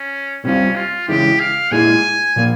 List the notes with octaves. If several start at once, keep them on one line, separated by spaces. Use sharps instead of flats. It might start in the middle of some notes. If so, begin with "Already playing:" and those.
Already playing: C#4
C2 C3 G3 C4 C#4 F4
F4
C#3 E3 G#3 E4 G4
F5
A#2 G#3 E4 G#4 G#5
A#2 F3 A#3